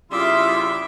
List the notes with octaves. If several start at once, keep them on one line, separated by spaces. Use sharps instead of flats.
C#3 G3 E4 F4 E5 C6 D6 D#6